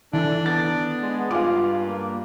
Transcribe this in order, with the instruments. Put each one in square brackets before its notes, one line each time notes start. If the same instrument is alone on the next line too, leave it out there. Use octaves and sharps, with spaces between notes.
[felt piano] E3 [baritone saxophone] D4 [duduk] A4
[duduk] B3 [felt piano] A6
[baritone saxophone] G#3
[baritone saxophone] G2 [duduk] F4 [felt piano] F5 G#5 D6
[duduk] A#3